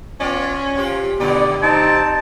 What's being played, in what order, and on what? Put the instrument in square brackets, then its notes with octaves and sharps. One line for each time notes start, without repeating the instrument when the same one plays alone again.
[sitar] B3 F4 D5 [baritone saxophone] C#4
[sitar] C3 F4 G4
[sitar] G#2 D3 G4 [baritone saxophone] B2 [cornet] D5
[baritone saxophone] C4 [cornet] D#4 [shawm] A5